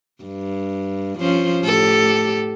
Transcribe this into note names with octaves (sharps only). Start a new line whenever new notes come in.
G2
F3 C#4 C5
A2 G4 A4